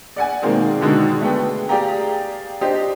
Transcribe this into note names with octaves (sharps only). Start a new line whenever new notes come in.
D5 F#5 G#5
B2 D#3 G#3 A#3 C4 G#4
B2 D3 D#3 G#3 D4 F#4
A3 B3 G#4 G5
G4 G#4 D5 F5 G5 A#5
D4 G4 C5 D5 D#5